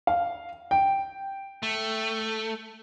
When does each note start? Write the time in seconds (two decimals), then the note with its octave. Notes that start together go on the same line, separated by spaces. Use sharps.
0.07 F5
0.71 G5
1.63 A3